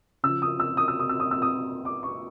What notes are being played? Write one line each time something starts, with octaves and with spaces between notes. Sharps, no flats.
C#3 F3 E6
D#6
E6
D#6
E6
D#6
E6
D#6
E6
D#6
D6
C#6